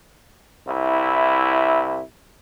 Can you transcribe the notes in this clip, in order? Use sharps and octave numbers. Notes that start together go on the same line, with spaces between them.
C2 E4